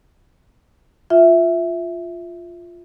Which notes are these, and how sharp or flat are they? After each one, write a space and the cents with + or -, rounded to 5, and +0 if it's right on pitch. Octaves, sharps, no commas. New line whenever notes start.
F4 +0 E5 +0